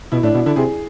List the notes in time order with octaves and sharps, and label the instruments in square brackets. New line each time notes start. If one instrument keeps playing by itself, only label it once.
[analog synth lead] B2 [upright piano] E4
[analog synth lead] A2 [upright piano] D4
[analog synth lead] B2 [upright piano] E4
[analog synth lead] D3 [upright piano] E4
[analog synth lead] C3 [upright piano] G#4